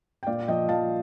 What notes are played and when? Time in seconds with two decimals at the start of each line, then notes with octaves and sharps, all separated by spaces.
0.23 G5
0.26 A#2 D5 F5
0.48 F3 D#5 G5
0.69 F3 F5 A5